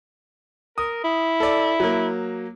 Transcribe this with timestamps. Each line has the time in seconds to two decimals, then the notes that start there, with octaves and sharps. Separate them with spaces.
0.78 A#4 D#6
1.04 E4
1.40 A4 D5
1.80 F#3 A#3